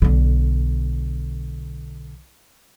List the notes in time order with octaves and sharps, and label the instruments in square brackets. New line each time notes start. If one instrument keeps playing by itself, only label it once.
[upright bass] B1 D3